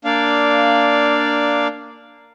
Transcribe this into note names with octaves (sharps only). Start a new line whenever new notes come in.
A#3 D4 D5 F5